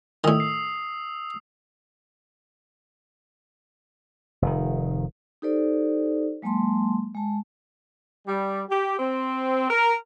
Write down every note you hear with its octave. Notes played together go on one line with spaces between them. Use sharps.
A2 D#3 D#6 E6
C7
F1 D#3
D#4 G4 A4 C5 D5
F#3 G#3 A#3 A5 C6
G#3 A5
G3
G4
C4
A#4